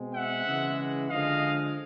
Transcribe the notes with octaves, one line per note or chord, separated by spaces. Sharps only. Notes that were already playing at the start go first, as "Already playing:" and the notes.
Already playing: B2 G#3 C4
E5 F#5
C#3 E3 G#3
D3 F3 G#3 D#5 F5